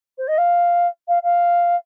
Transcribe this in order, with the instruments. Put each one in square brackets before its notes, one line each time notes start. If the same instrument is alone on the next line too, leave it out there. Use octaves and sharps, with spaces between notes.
[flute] C5
D#5
F5
F5
F5